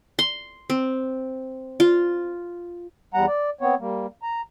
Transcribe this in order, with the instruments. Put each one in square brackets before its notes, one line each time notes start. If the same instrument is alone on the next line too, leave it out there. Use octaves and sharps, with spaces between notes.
[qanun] C6
C4
F4
[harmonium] E2 G3 F#5 A#5
D5
B3 C4 C#5
G3 A#3
A#5